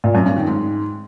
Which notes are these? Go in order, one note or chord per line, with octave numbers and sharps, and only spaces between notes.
A#2
F#2
G2
D#3
G#2